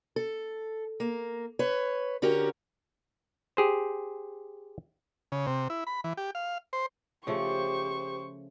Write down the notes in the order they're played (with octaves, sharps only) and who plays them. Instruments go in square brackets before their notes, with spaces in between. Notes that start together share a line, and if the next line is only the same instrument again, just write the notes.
[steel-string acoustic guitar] A4
A#3
B4 C#5
D3 C#4 F#4 G4 A#4
[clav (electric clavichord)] G4 G#4 C5
[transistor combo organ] C#3
C3
E4
B5
E3
G4
F5
C5
[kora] C#3 F3 A3 [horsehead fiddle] G4 [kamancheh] C5 C#6